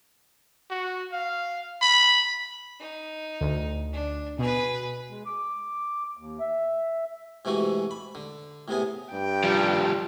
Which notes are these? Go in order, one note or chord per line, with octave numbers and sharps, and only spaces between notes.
F#4
F5
B5
D#4
D2
D4
B2 G#4 B4
G#3
D6
D#2
E5
G#2 C3 E3 A3 F#4
B5
D3
A2 C3 B3 G#4
G2 G5
F3 G3